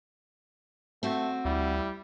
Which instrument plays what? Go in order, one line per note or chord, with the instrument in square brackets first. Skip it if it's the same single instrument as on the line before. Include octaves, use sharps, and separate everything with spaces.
[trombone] A3 [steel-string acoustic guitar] C4 F#4
[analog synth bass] D2 [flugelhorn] G3 [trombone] E4